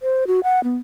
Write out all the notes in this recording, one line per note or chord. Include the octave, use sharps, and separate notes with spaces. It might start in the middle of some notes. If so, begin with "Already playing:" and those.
C5
F#4
F#5
B3